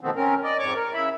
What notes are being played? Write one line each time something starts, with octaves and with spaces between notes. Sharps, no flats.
B2 D#3 F3 A3 B3 C4
C4 C#4 A#4
D5 D#5
F2 G#2 C#5 C#6 D6
A#4
C#3 E4 E5 B5